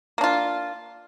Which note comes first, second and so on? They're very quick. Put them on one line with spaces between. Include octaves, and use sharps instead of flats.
A#3 D4 F4